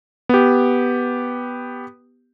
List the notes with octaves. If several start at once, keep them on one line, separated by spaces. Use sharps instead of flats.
B3 G4